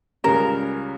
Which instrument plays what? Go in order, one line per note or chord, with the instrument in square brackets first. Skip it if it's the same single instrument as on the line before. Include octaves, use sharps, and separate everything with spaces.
[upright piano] C#2 C#3 G3 C#4 [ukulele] A#4